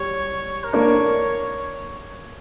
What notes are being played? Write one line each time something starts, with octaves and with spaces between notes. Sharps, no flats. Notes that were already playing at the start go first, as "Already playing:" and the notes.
Already playing: G3 C#5
A#4
A#3 D4 C#5